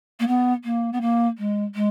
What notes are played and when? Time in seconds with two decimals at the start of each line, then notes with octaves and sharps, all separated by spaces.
0.20 A#3
0.27 B3
0.64 A#3
0.93 B3
1.01 A#3
1.38 G#3
1.75 G#3